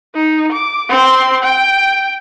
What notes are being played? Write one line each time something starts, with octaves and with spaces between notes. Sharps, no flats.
D#4
D6
C4 C6
G5